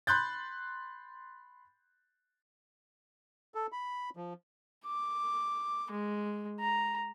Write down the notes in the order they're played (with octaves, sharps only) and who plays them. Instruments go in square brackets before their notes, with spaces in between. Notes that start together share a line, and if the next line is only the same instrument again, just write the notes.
[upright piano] B5 C6 F#6 G6 A6
[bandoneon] A4
B5
F3
[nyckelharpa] D6
G#3
A#5